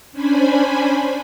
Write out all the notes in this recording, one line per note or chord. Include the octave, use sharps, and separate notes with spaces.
C#4 D4 C5 G#5 B5